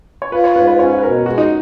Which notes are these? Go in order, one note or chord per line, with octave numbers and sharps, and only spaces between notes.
C#5
F4 B4
C#5
G#2 B4
B4
C#4 C#5
B4
B2 A#4
G#3 F#4
D#4